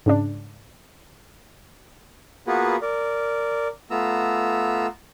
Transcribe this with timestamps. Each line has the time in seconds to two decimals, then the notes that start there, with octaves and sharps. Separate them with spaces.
0.06 G#2 C#3 D4
2.47 A#3 B3 F4 F#4 G#4 B4
2.81 A#4 D5
3.91 A3 B3 F4 A#5 E6